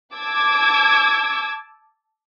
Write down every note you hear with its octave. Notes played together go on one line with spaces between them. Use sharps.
A5 D6 E6 G#6